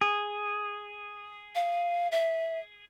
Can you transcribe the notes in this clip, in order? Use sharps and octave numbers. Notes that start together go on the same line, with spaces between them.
G#4
F5
E5